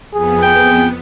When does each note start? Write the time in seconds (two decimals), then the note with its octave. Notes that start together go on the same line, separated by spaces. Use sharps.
0.14 F2 B3 G#4
0.43 G5